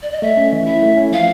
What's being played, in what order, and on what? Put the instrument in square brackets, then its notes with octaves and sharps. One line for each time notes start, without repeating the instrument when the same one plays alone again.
[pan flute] D5
D#5
[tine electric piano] A3 [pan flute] E5
[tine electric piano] C#4
E3
[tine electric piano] E4 [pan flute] E5
[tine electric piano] A3
C#4
[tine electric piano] F3 [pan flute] F5